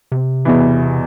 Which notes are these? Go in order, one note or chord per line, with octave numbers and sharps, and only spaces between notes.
C3
E2 B2 E3